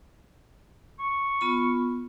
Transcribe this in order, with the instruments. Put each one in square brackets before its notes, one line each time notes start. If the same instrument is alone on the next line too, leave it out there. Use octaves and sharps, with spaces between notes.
[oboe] C#6
[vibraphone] B3 F4 B5